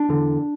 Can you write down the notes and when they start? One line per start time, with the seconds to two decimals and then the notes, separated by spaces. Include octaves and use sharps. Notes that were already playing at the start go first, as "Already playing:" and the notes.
Already playing: D4
0.09 E2 D3